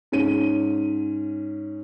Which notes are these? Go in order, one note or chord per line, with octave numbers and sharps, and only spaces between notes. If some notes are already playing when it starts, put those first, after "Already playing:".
G#2 C#4 D#7